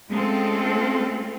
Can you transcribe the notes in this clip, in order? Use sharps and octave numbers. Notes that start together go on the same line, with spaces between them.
G#3 A3 C4 C#4 F4 A4